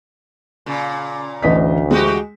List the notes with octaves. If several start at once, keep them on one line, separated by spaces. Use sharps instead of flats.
A#2 C#3
A1 D2 D#5 B6
E3 G#3 F#4 G4